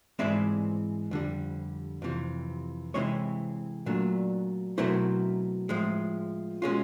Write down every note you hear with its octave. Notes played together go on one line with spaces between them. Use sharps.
G#2 E3 G#3 C4 D5 E5
F2 D3 G3
F2 C3 E3
C3 E3 G#3 C4 E4 C#5 D#5
A#2 F#3 A3 D4
B2 F#3 A3 C4 E4 A#4 C5
A2 F3 G#3
B2 G#3 C#4 F4